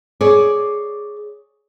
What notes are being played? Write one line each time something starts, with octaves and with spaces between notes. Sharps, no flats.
G#4 C#5 D5